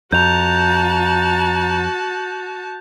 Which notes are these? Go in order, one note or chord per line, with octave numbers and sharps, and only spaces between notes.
F2 F#4 A5 A#5 G6 F7